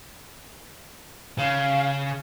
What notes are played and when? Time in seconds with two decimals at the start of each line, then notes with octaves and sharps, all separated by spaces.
1.38 C#3 F5